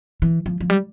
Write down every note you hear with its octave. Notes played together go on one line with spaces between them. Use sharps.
E3
F3
F3
G3